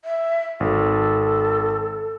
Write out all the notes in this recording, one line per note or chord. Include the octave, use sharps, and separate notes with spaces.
E5
G#1 A4